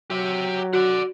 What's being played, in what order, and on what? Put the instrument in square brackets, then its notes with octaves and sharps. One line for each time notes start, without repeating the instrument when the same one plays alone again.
[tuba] F#3 [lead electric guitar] G4 E5
[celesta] F#4 [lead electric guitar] D5 F#5